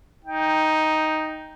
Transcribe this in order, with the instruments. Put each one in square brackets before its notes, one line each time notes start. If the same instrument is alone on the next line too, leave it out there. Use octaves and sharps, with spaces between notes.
[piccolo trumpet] D#4 [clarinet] G5